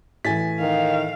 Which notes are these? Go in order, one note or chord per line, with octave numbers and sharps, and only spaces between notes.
A2 E3 G#5 A6 B6
D#3 F5